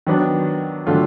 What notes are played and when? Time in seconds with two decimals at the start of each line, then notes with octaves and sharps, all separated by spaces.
0.07 D#3 F#3 B3 D4
0.87 D3 F#3 A3 D4 F4